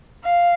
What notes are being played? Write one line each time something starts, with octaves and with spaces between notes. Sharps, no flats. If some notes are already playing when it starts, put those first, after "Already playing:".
F5